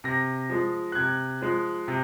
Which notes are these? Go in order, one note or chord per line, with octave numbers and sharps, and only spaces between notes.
C3 A#6
F3 G#3
F#6
C3 G#6
F3 G#3
C3